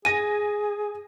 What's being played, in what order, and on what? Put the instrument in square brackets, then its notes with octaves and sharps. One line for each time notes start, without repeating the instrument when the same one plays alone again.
[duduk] G#4 [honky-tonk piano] G#5 A#6 [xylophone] D#7